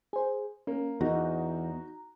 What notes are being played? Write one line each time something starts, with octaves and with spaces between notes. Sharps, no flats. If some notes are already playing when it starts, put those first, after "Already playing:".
G#4 C5
A#3 C#4
E2 D#4 F#4 A#5